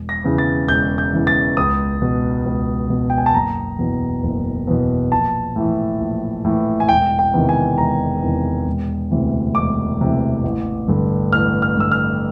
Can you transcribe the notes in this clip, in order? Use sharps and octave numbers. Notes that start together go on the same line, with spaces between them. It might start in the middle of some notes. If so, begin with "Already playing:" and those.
Already playing: E1
A#6
E2 C#3 E3
A6
E1 G6
G6
E2 C#3 E3
A6
C#2 D#6
B2
C#2
B2
G5
G#5
A5
F#1 A#5
E2 B2
F#1
E2 B2
A#1 A5
A2 E3
A#1
A2 E3
G#5
E1 G5
G5
E2 C3 D#3
G#5
E1 A#5
E2 C3 D#3
E1
D2 C3 E3
E1 D6
D2 C3 E3
A1
G2 D3
A1 F6
F6
G2 D3 E6
F6